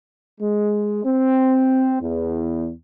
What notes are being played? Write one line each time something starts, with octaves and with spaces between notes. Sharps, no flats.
G#3
C4
E2